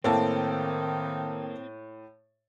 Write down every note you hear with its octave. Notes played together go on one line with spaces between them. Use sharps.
A2 D#3 A#3 C4 A4 A5